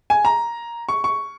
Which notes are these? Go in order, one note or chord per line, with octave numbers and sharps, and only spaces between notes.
G#5
A#5
C#6
C#6